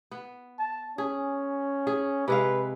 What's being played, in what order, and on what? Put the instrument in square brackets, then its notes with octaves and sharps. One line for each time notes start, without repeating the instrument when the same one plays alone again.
[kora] B3
[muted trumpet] A5
[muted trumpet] C#4 [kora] G#4
[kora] G#4
[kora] C3 G#3 F5 [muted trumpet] B4